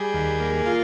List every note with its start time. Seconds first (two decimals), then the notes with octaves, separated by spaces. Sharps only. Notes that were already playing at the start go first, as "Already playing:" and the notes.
Already playing: G3 G#4
0.14 D#2
0.40 A#3
0.66 F4